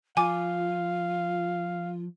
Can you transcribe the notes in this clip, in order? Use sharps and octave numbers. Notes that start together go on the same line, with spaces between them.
F3 F4 F5 G#5 D6